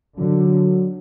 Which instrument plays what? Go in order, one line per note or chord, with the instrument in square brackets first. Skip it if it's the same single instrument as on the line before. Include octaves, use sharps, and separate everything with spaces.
[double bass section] D3 [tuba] F#3